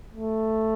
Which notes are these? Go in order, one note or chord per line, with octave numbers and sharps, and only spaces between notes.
A3